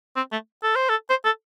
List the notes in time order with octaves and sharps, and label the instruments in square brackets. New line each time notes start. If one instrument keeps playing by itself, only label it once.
[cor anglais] C4
A3
A4
C5
A4
C5
A4